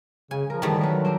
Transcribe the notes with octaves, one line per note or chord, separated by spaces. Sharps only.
C#3 G#5
F3 A#4
D#3 E3 G3 A3 B3
F#3 A#4 B4
C4 D4 A#4